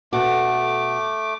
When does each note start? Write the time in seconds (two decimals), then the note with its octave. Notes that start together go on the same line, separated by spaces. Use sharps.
0.13 B2 A3 F#4 A4 D6